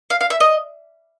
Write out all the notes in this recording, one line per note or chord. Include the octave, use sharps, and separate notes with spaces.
F5
F5
E5
D#5